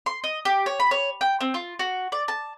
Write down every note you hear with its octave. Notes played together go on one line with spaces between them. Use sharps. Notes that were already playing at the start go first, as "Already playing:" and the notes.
C6
D#5
G4
C#5
B5
C#5
G5
C4
F4
F#4
D5
A5